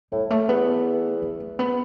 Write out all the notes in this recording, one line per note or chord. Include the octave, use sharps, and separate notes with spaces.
A2 G3
A3
E2 B3
B3
A3
B3